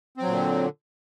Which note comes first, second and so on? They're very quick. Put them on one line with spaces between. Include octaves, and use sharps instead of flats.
C4 F#3 A#2 D3